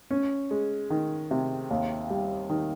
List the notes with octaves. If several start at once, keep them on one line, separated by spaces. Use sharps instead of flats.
C#4
G#3
D#3
C3
D#2
G3
D#3